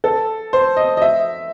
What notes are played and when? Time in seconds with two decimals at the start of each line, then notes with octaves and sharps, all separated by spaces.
0.04 A4
0.53 C5
0.77 D#5
0.97 D#5
1.02 E5